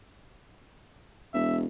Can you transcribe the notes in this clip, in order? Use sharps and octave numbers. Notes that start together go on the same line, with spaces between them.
E1 E5